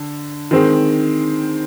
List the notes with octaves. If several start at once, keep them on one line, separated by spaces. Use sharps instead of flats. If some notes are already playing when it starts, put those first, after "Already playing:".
Already playing: D3
D#3 G#3 C4